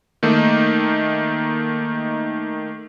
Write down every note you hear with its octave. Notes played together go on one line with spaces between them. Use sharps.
D#3 A3 A#3 D#4